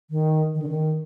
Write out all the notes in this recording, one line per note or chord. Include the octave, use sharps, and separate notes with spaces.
D#3
D#3
D3
D#3